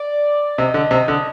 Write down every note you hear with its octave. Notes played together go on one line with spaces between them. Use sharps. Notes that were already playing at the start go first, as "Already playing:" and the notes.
Already playing: D5
C3 D#5
D3
C3
D3